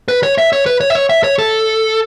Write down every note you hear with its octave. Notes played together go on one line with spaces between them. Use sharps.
B4
C#5
E5
C#5
B4
C#5
E5
C#5
E5
C#5
A4